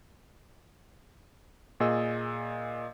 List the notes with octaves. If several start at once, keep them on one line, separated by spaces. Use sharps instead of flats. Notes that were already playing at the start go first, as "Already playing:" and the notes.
A#2 G#4 D#5 E6